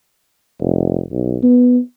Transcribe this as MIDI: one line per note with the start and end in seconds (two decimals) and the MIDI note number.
0.60 1.02 29
1.11 1.37 35
1.43 1.79 59